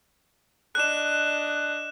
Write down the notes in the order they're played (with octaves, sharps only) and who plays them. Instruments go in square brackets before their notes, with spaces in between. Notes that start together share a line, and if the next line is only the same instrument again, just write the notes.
[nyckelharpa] D4 D#5 [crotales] F#6 E7